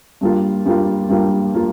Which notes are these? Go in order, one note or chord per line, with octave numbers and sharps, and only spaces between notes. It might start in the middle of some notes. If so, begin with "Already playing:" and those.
G2 G3 A#3 F4
G2 G3 A#3 F4
G2 G3 A#3 F4
G3 A#3 F4